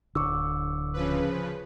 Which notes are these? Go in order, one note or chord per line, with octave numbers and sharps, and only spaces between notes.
D1 G#1 D3 C#6 D6 E6
C#3 F3 B4